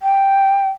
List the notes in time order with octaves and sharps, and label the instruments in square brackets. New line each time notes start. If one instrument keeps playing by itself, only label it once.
[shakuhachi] G5